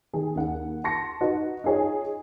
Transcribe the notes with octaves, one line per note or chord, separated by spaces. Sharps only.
D#3 G#4
D#2 F#5
A5 C6 C#6 A#6 C#7
D#4 F#4 B4
D#4 F4 G#4 C#5